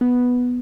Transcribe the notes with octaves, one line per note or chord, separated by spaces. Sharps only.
B3